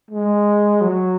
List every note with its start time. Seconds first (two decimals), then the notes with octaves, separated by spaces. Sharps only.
0.11 G#3
0.81 F#3